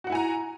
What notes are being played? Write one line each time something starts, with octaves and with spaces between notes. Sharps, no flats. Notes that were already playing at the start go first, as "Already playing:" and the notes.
E4 F#4 F#5 G#5 A#5